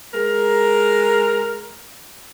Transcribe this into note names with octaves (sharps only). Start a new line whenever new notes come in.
G#3 A#4